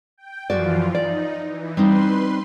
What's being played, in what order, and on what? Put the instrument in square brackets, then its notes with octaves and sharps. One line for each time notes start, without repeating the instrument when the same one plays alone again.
[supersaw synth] G5
[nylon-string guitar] F#2 F#4 D5 [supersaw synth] E3 F3 F4
[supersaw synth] D#4 [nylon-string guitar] D5
[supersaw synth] E3
[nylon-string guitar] G3 C4 D#4 [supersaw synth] B4 C6